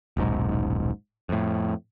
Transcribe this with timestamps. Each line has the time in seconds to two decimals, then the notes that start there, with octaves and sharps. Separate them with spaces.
0.17 D#1 B1 G#2
1.29 F2 A2